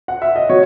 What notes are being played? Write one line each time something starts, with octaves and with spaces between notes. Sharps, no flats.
F#5
E5
D#5
F#3 C#5